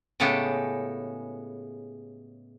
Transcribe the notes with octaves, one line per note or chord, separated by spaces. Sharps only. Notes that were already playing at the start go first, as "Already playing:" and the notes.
A2 C#3 G#3 B3 G4 A4